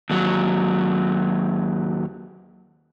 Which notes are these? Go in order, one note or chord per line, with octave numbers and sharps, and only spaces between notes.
D#2 F#3